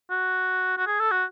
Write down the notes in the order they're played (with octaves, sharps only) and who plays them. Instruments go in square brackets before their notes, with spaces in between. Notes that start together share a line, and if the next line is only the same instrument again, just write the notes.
[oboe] F#4
F#4
G#4
A4
F#4